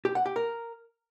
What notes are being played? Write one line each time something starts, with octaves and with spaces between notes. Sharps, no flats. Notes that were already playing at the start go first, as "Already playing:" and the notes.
G4
F#5
G4
A#4